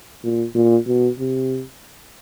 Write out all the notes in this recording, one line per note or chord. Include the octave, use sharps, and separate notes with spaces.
A#2
A#2
B2
C3